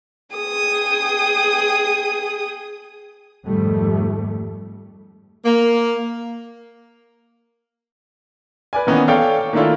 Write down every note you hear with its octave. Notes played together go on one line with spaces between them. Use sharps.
G#4 G5 D#6
F2 G#2 D#3 G3 A3
A#3
B4 D5 G#5
D#3 E3 A#3 B3 C#4 D#4
A4 C#5 D5 F5 G5
D#3 A3 A#3 D4 E4 F4